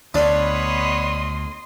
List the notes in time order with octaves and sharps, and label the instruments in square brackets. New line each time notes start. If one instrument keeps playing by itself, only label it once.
[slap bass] D2 [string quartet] B3 B4 C#5 [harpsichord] D4 [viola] D#5 C6